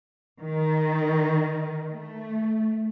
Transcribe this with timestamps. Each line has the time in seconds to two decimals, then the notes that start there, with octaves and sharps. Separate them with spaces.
0.40 D#3
1.93 A3